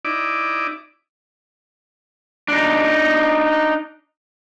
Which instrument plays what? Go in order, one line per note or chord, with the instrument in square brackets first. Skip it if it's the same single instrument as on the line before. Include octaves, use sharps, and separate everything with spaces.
[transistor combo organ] D#4 E4 D5 D6
[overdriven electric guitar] D4 D#4